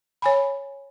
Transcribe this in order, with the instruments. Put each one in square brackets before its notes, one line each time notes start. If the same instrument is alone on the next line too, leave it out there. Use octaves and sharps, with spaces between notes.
[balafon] C#5 G#5 B5